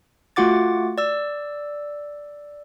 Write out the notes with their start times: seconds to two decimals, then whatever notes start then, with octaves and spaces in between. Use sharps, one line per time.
0.36 A3 F4 F#4 F#5 D6 A6
0.98 D5 E6